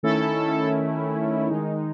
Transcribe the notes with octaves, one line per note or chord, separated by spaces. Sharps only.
D#3 A3 C#4 E4 A4
D#3 G#3 D#4